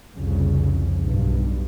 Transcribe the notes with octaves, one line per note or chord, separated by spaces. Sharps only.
C2 F2 C#3
B1 G2